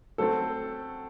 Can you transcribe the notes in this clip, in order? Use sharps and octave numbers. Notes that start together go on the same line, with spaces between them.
F#3 A3 C4 A4